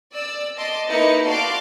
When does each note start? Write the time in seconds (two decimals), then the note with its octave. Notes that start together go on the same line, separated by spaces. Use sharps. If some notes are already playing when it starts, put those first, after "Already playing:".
0.13 D5 E6
0.57 D#5 A5 C6 D6
0.89 A#3 D#4 E4 B4 D#5 C#7
1.26 F#4 D5 F5 A5 C6 D6